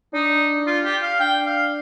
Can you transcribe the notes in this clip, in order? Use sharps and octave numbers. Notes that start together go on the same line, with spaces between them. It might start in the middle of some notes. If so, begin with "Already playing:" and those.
D4 D#4
F4
G4
F5
D4 G5
F5